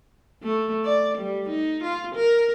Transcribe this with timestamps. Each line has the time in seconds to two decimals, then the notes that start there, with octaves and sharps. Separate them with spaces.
0.42 A3
0.84 D5
1.18 G3
1.49 D#4
1.83 F4
2.15 A#4